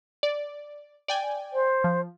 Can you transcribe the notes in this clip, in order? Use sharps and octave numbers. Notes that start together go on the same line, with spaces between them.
D5
D5 G5 G#5
C5
F3